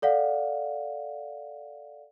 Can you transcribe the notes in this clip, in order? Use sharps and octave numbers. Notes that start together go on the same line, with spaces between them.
A4 D5 F5 F#5